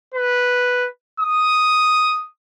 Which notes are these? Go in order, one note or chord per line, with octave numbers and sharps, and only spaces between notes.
B4
D#6